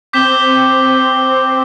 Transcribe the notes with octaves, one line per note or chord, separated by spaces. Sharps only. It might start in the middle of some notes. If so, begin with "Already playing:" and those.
C4 D6 G6 B6 E7 G7